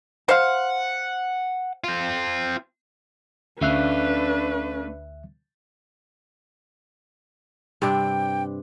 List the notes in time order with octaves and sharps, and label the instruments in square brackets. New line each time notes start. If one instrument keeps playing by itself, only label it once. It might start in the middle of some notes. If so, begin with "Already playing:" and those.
[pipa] C5 F5 [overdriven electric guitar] F#5
[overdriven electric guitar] C4 F4
[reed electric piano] D2 E5 F#6 [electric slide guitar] A3 C#4 F5 [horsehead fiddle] D4 B4
[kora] G2 C3 D4 [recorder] G5